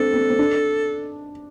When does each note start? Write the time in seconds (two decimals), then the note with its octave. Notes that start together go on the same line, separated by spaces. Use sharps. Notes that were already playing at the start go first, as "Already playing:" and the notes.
Already playing: C4 D4 A4
0.14 C4
0.30 C4
0.39 D4